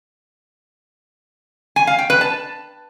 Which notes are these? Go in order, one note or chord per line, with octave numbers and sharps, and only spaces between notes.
G#5
F5
G5
B4
A5